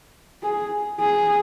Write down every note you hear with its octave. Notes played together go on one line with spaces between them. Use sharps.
G#4
G#4